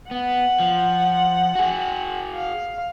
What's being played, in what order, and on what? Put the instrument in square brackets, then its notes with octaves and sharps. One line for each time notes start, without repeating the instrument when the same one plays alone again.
[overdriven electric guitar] B3 [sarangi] F#5
[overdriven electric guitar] F3
F#4 G#4
[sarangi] F5